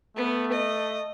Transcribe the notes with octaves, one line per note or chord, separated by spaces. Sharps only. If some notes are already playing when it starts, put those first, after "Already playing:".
A3 B3
D#5